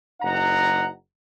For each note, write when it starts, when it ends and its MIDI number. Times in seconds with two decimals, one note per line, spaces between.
0.21 0.87 30
0.21 0.87 63
0.21 0.87 78
0.21 0.87 82